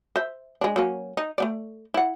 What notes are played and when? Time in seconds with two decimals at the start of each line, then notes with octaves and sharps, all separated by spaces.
0.16 C5 E5
0.61 G#3 D4
0.76 F#3 A#3 C#4
1.17 D#4
1.38 A3 B3 D5
1.94 E4 F#5